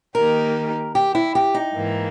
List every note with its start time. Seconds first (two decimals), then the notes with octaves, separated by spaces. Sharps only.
0.15 D#3 A#3 D#4 G4 A#4
0.95 G4
1.15 E4
1.35 G4
1.54 D#4
1.74 G#2 E3 A#3